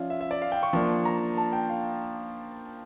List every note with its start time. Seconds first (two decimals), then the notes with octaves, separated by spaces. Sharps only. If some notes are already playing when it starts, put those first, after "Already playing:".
Already playing: F3 C#4 F4 D5 E5 F5
0.10 E5
0.21 E5
0.31 D5
0.42 F5
0.52 G5
0.63 C#6
0.73 F3 A#3 D4
1.05 A#5
1.37 A5
1.53 G5
1.69 F5